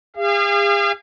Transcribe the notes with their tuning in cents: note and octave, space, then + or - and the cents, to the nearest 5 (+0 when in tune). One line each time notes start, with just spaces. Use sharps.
G#4 -45 F5 -35